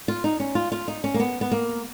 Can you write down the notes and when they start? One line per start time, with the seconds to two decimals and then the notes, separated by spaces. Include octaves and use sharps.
0.08 F4
0.24 D#4
0.40 C#4
0.55 F4
0.72 F4
0.88 D#4
1.04 C#4
1.14 A#3
1.20 B3
1.41 B3
1.52 A#3